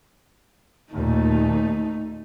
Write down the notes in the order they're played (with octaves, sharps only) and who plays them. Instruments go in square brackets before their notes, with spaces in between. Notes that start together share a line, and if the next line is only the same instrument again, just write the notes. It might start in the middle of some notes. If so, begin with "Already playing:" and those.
[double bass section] D#2 A#2 [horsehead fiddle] A3 D#4